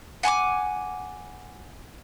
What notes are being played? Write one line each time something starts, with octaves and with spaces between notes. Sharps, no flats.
F#5 G#5 C#6 D6